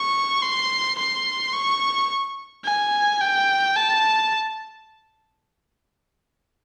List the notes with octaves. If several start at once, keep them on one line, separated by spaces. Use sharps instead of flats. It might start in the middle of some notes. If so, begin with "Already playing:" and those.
Already playing: C#6
C6
C6
C#6
G#5
G5
A5